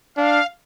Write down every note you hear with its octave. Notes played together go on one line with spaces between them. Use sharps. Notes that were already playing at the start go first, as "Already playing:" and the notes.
D4 F5